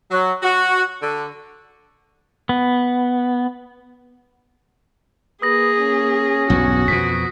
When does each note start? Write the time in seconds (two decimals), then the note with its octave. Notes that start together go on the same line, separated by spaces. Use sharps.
0.11 F#3
0.43 F#4
1.01 D3
2.49 B3
5.42 A#3 G#4 B4 D#6 A#6
5.79 C#4
6.50 B1 E2 G2 F#4
6.88 F2 B2 B6